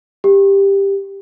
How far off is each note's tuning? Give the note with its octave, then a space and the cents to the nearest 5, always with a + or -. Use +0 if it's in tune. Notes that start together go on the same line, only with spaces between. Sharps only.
G4 +10